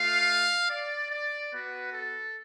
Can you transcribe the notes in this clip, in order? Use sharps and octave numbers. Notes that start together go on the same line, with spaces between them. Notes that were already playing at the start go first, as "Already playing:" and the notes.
Already playing: A3 F4 F5
D5
D5
B3 F#4 B4
A4